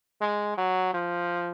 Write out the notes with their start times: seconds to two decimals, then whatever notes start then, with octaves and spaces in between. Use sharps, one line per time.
0.22 G#3
0.58 F#3
0.94 F3